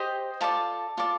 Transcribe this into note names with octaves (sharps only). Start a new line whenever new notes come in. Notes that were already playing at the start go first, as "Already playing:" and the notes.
Already playing: G4 C5 D#5 G5
F4 A4 D5 A5
F4 A4 D5